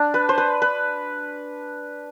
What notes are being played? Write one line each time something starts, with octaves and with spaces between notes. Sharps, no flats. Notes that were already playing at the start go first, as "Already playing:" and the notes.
Already playing: D4
B4
C5
B4
B4